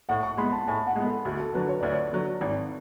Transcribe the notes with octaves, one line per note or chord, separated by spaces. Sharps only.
A2 F#5
C#6
G#3 B3 B5
A5
A2 G#5
F#5
G#3 B3
A4
D2 F#4
A4
D3 F#3 B4
C#5
D2 D5
C#5
D3 F#3
G#1